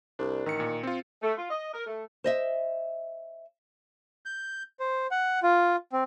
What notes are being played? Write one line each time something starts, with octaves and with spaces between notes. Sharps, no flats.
C2 D4
A1 D#3 C#7
A#2
C4 F4
A3
F4
D#5
A#4
A3
C5 D#5 E5
G6
C5
F#5
F4
C4